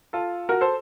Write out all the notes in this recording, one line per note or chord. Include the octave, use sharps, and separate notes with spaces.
F4 A4
F#4 A#4
A4 C5